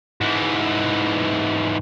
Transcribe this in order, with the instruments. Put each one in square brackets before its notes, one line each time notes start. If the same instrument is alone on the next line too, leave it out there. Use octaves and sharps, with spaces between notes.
[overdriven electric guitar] G#2 E3